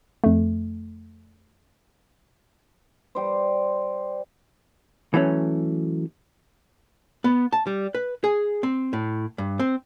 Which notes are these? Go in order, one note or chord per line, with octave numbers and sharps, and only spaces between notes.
F2 A3
G3 C5
E3 F#3 A3 C#4
B3
A5
G3
B4
G#4
C4
A2
G2
C4